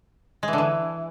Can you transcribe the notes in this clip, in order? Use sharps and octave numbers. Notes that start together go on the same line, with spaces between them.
G#3
E3
D3
E3